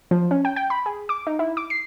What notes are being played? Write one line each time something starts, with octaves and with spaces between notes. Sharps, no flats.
F3
C#4
G5
G5
B5
G#4
D6
D#4
E4
D6
C7